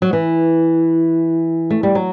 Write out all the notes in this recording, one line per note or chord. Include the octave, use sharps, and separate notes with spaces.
F#3
E3
A3
G3
F#3